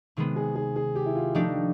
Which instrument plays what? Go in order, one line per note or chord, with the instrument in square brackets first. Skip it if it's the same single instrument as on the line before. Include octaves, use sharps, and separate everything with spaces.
[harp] C3 D#3 G#3 B3
[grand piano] G#4
G#4
G#4
G4
E4
F4
[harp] F3 A3 D4 G4 [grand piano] D#4